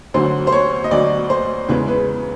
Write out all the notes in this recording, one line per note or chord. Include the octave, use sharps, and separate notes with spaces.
D2 D3 F#3 C5
C5
C#5
D#5
D2 D3 F#3 D5
C5
E2 C#3 E3 G#3 B4
B4